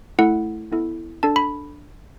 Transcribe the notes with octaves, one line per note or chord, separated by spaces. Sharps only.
A3 E4 A4 F#5
B3 E4 A4
D4 A4 A5
B5